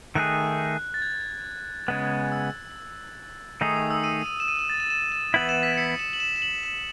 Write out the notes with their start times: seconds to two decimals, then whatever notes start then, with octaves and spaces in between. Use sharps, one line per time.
0.15 D#3 A3 D#4 G#4 F#6
0.94 A6
1.02 G#6
1.88 C#3 G#3 B3
2.32 E6
3.61 D#3 A3 D#4 G#4 D#6
3.76 D#6
3.91 E6
4.04 D#7
4.26 D#7
4.40 E7
4.48 D#7
4.59 E7
4.69 A6
4.80 E7
4.90 E7
5.12 E7
5.34 E3 B3 E4 F#7
5.49 E7
5.63 B6
5.77 C#7
5.99 E7
6.13 F#7
6.20 E7
6.36 E7
6.42 F#7
6.63 E7